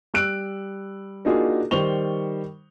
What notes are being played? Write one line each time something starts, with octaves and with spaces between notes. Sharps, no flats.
G3 E6 F#6 D7
A#3 D4 D#4 F4 F#4 G#4
D#3 G3 C5 C#6 F7 G7